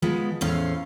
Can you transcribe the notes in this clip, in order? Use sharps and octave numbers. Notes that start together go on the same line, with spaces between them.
F3 G#3 B3
E2 A2 C#4 C5 F5